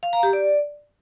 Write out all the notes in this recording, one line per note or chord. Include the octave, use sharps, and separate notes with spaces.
F5
A#5
G4
D5